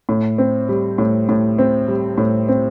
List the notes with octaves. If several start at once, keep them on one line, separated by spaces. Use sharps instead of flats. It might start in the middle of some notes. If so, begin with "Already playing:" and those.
A2
C4
G3
A2
A2
C4
G3
A2
C4